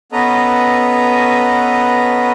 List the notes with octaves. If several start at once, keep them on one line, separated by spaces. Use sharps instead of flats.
B3 C#4 A4 B4 D#5 A#5